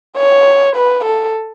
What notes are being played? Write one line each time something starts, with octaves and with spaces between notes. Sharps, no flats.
C#5
B4
A4